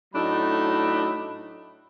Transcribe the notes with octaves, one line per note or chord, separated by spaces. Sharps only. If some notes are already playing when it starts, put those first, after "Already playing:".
A2 F#3 A3 D4 D#4 B5